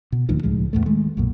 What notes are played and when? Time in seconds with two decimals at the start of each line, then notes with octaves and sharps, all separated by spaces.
0.12 B2
0.29 D#1 D2 D#3 F3
0.43 C#2 A2 F3 G#3
0.73 E2 A2 A3
0.86 D#3 G#3 A3
1.17 B1 F#2 A#2